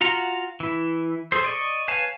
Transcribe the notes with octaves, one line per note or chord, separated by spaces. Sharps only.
F4 F#4 F#5 A#5
E3 E4
G#4 A4 C5
D5 D#5 C#6
B4 C#5 F5 G#5 A5